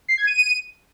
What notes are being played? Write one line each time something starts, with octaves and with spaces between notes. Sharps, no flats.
C7
G#6
D#7